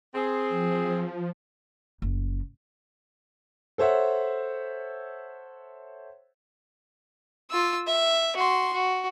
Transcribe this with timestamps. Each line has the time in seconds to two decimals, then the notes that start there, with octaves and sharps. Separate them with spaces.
0.15 C4 G#4
0.49 F3
2.02 F#1
3.78 A4 C5 C#5 E5 F#5
7.50 F4 E6
7.87 E5
8.36 F#4 C6
8.73 F#4